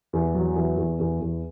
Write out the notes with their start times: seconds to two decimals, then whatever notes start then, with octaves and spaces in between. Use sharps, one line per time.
0.13 E2
0.35 F#3
0.56 E2
0.77 E2
0.99 E2
1.20 E2